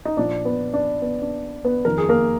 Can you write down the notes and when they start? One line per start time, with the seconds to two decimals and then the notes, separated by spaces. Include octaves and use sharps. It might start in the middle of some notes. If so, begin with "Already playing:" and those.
0.05 D#4
0.17 A#2 F3 D4
0.45 B3
0.74 D4
1.02 B3
1.22 D4
1.65 B3 B4
1.85 F2 D#3 A#4
1.98 G#4
2.09 A#3 A#4